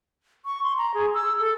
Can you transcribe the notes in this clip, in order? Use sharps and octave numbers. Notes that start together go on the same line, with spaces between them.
C#6
C6
A#5
G#4
E6
A4